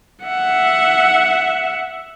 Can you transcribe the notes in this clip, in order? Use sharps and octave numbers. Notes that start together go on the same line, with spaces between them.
E5 F#5